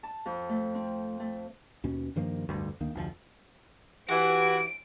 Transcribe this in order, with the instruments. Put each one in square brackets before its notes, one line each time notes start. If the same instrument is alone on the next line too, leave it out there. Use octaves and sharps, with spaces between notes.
[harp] A5
F2
A3
C4
A3
[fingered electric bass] D#2 B2 C#4
G2 D#3 F3 A#3
F1 D2 G2
D2 D#3 A#3
F1 D2 G#2 F3
[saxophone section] E3 [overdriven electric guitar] F#4 [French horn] G4 [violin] D7